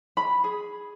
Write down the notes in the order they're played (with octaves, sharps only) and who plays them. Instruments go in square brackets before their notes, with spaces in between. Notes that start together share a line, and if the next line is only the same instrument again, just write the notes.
[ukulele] B5
G#4